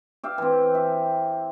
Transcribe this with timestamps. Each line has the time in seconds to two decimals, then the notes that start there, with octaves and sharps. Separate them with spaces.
0.23 G4 E5 F5
0.38 E3 C4
0.75 E5